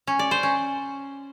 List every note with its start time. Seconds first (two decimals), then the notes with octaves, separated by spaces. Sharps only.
0.07 C#4
0.19 D5
0.31 C5
0.43 C#4